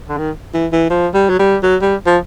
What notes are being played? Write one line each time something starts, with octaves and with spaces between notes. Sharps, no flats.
D3
D#3
E3
E3
F3
G3
F#3
G3
F#3
G3
F3